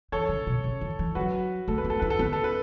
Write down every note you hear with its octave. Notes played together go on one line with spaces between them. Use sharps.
E3 A4 C#5
C#3
B2
C#3
E3
E3
F#3 F#4 B4
A3 A4
B4
B3
A4
E4 B4
A4
B3 B4
A4
B4